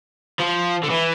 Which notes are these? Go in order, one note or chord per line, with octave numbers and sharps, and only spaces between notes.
F3
D3
E3